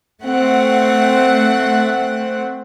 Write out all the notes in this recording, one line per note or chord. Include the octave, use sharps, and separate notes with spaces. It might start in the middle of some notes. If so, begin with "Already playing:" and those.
A3 C4 F#5